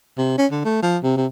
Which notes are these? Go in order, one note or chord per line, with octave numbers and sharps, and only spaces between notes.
C3
C#4
D3
A3
F3
C3
C3